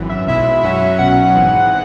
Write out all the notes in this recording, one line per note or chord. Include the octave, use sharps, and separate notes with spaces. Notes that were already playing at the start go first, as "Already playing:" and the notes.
Already playing: G#1 F#2 E3
E5
B1 B2 G#3 E4 E5
F#2 F#3 C#4 F#4
B1 B2 F#3 C#4 F#5
G#1 G#2 E3 G#3